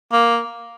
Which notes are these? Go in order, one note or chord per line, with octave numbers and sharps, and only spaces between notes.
A#3